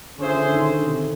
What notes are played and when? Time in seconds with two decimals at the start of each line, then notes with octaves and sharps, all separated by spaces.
0.18 D3 C#4 F4 G#4 C5 E5
0.35 D3
0.52 D#3
0.69 D3
0.86 C3